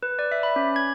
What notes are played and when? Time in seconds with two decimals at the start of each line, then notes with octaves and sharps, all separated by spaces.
0.03 B4
0.19 D5
0.32 E5
0.43 B5
0.56 C#4
0.76 G#6